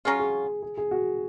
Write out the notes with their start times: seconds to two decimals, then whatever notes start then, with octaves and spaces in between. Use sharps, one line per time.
0.05 F#3 C#4 F4 G#4
0.19 G#4
0.62 G#4
0.77 G#4
0.91 F#4